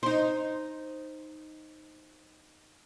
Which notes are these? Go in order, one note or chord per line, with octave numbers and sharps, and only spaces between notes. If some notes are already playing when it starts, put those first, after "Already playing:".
D#4 C5